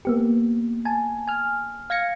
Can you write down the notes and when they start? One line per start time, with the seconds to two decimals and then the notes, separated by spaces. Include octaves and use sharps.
0.05 A#3 B3 G4
0.85 G#5 A5
1.28 G#5 F6
1.90 F5 G#6 A#6 C#7